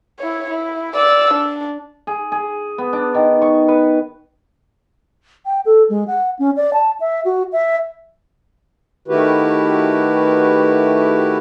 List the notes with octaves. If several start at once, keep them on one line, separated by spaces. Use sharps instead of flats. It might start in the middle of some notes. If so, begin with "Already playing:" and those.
E4 C#5
E4
D5 E6
D4
G#4
G#4
B3
D4
D#3
C#6
B4
G5
A4
G#3
F#5
C#4
D5
A5
E5
F#4
E5
D#3 A3 E4 F#4 G4 B4